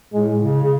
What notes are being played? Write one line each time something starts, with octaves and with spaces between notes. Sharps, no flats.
A2 G#3
C#3
C#3